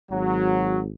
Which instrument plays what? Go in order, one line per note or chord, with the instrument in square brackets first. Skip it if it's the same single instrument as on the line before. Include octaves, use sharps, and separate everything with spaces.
[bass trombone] G#1 [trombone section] F#3